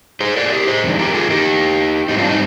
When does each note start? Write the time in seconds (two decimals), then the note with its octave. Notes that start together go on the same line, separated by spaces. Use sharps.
0.20 G#4 C5
0.37 A#4 D5
0.45 G#4
0.52 G4 A#4
0.67 G#4 C5
0.83 F2 D#3 G#3 D4
0.99 G4 A#4
1.14 F4 G#4
1.30 D#4 G4
2.08 G#2 G3 C4 D#4
2.18 D4 F4
2.29 D#4